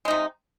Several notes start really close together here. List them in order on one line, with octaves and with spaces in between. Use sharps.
G#3 D#4 C3